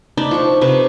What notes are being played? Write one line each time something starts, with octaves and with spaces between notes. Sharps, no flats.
D4 D#4 B5
F3 C#6
C3 B4 C#6